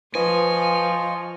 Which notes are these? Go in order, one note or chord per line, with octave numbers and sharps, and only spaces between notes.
F3 F4 B4 C5 D#5 G#5 C#6